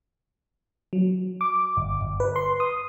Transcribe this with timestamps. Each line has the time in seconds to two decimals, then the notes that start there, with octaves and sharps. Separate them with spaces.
0.93 F#3
1.41 D6
1.77 G1
2.01 G1
2.20 B4
2.36 C6
2.60 D#6